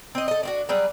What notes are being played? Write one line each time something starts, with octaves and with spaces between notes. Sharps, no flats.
C4 D#5
A4 D#5
D4 F4 F#4
F#3 G3 G#4 B4